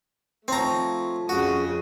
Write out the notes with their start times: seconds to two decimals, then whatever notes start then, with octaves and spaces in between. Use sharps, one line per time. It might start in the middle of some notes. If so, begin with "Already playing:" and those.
0.48 F3 A3 C4 C#5 A#5
1.29 F2 C#3 F#4 D#6